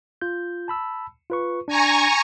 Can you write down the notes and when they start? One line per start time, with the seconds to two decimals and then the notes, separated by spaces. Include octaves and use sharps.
0.21 F4 G6
0.68 A5 B5 E6
1.30 F4 B4 C#6
1.68 D4 G#5 A#5 C#6